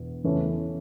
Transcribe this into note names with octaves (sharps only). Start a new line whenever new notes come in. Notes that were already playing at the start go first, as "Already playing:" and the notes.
Already playing: E1 E2
E2 C#3 E3 A3 C#4